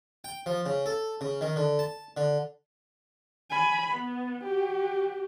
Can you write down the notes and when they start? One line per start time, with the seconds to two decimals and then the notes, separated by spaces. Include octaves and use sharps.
0.24 G5
0.46 F3
0.66 C#3
0.86 A4
1.21 C#3
1.41 D#3
1.56 D3
1.79 A5
2.17 D3
3.51 G#5 B5
3.93 B3
4.44 F#4 G4